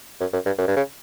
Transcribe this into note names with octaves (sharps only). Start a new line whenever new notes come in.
F#2
F#2
G2
F#2
G2
C#3